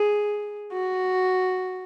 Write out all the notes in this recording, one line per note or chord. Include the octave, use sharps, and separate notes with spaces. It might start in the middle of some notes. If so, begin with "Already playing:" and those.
Already playing: G#4
F#4